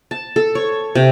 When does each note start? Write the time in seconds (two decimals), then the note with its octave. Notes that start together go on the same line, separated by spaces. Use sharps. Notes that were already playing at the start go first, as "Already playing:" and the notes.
0.11 A5
0.36 A4
0.55 C#5
0.95 C3